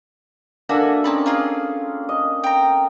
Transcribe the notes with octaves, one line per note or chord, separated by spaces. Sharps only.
A#3 D4 F#4 A4 E5 G#5
A#3 C4 C#4 D#4 A5 B5
A#3 F4 G#4 F5
D#5
G5 A#5